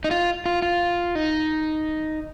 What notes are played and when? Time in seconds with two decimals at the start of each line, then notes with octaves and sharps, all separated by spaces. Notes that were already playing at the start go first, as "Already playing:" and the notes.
0.04 D#4
0.11 F4
0.46 F4
0.62 F4
1.15 D#4